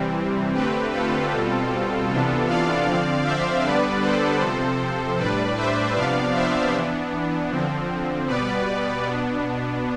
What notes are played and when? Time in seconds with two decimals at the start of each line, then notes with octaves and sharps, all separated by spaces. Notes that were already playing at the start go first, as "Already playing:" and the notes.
Already playing: C3 E3 G3 C4
0.54 D3 A3 C4 G4 B4
0.92 F4 A4
1.31 B2 G3 C4
2.09 C3 E3 B3 D4
2.47 D5 F5
2.86 D3 F3 C4
3.24 C5 E5
3.63 D3 G3 B3 D4 B4 D5
4.02 A4 C5
4.41 C3 F3 C4 A4 C5
5.18 A2 G3 D4 B4 D5
5.56 C5 E5
5.95 C3 F3 B3 D4 D5 F5
6.34 C5 E5
6.72 E3 B3 D4
7.51 D3 F3 C4
8.27 B2 G3 B3 B4 D5
9.05 B2 B3 D4